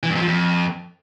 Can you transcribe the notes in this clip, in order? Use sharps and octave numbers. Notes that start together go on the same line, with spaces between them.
E3
G2
F2
F3
F2